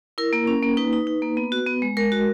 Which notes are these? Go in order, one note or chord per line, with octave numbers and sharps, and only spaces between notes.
E4 A#4
A#3
C#4
A#3
D#4 B4
D#4
D#4
A#3
B3
F#4
B3
G#3
G#3 A#4
F#4